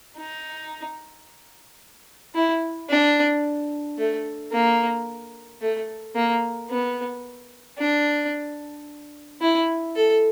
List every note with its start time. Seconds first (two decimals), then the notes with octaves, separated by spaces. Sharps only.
0.17 D#4
2.35 E4
2.89 D4
3.98 A3
4.52 A#3
5.61 A3
6.15 A#3
6.70 B3
7.79 D4
9.41 E4
9.95 A4